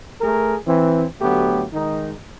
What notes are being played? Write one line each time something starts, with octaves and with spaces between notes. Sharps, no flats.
A3 G#4 A#4
E3 C4
D2 F#3 A3 B3 G4
D#3 G#3 D#4